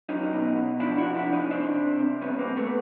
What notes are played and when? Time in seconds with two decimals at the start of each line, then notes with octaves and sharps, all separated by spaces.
0.09 F#3 C#4 D#4
0.33 B2
0.56 B2
0.80 F3 D4 E4
0.97 E4 F#4
1.04 C3
1.15 D4 E4
1.28 C3
1.33 C#4 D#4
1.50 C3 C4 D4
1.74 C3
1.98 C3
2.21 G3 B3 C#4
2.39 A#3 C4
2.45 G3
2.56 A3 B3